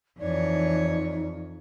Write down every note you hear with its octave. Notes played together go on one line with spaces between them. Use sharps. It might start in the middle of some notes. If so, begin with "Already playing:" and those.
F2 E3 D#4 C#5 D5